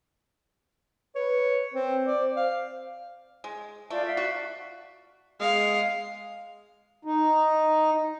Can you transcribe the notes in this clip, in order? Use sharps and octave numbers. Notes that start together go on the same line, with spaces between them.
B4 C#5
C4 C5
D5
F5
G#3
A3 F4 D5
D5 E5 F5
F#4
G#3 F5
D#4